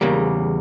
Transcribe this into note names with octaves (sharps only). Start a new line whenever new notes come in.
E2 C#3 G3 A#3